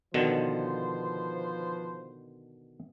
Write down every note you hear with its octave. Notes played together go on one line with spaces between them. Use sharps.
B2 D3 D#3 F3 B4 C5